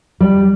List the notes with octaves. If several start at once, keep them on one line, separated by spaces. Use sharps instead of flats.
G3